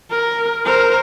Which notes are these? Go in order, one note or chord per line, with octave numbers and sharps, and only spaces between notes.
A#4
A#4 C5